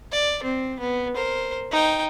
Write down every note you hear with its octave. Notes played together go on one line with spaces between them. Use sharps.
D5
C4
B3
A#4 C5
D#4 G5